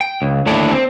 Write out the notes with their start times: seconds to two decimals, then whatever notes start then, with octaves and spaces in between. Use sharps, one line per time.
0.01 G5
0.22 C#2
0.46 D#2 D3 A3 E4 D5
0.72 C4